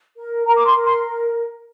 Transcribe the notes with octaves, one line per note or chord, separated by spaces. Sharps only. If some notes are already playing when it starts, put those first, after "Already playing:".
A#4
A#4 A#5
D6
C6
A#4
C6